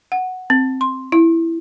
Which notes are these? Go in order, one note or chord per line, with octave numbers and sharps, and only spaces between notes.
F#5
C4
C6
E4